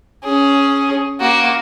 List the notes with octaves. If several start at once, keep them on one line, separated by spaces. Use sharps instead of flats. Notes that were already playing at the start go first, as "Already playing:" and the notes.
C#4 G#4
A#3 F#4